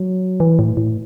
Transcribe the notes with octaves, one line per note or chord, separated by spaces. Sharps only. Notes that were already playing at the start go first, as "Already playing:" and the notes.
Already playing: F#3
E3
A2
A2